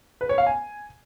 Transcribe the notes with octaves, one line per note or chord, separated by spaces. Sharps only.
B4
C#5
F5
G#5